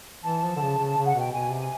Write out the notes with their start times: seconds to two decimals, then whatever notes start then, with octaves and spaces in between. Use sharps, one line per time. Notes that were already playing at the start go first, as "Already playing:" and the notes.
0.24 E3 A5
0.43 F3
0.56 D3
0.61 C#3
0.78 C#3
0.97 C#3
1.05 F#5
1.14 B2
1.20 G5
1.33 B2 G#5
1.50 C3
1.59 G#5